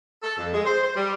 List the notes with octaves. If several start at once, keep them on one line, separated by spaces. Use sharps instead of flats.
A4
F2
G#3
C5
C5
G3